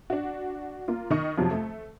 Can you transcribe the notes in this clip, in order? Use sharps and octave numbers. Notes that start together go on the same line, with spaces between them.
D4 F#4
A#3 F4
D#3 D#5 C#6
F2 C3 F3 F#3
A3